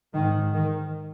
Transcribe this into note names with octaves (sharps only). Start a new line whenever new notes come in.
G#2 D#3
D#3